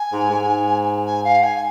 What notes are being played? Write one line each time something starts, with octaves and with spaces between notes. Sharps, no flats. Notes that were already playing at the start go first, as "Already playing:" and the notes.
Already playing: G#5
G#2
G#2
G#5
F5
G#5